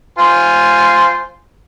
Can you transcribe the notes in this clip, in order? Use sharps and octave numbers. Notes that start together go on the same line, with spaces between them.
F4 C5 G#5